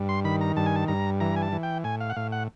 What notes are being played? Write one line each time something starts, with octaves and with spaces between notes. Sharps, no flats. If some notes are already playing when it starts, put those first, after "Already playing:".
Already playing: G2
C6
D#3 B5
A#5
G2 A5
G#5
A5
G2 A#5
E3 A#5
G#5
A5
E3
G5
A2 G#5
F5
F#5
A2 F5
F#5